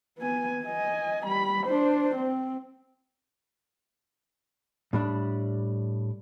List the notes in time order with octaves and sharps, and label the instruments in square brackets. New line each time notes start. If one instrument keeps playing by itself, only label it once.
[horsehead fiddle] B3 G#5
D#5 G#5
G3 B5
D4 C5
C4
[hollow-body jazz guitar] A2 G3 D4